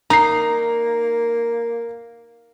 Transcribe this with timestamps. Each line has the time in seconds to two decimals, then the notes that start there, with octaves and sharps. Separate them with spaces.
0.10 A#3 D#4 A#5 C7